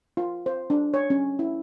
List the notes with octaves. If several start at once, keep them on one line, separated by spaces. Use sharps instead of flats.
F4
C5
D4
C#5
C#4
E4